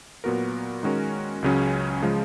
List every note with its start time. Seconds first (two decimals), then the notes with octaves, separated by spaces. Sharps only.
0.24 A#2 F#3 B3 F#4 A#4
0.83 D#3 G#3 C#4 F#4 A#4
1.42 C#2 C#3 F#3 C#4
2.02 C#3 F3 G#3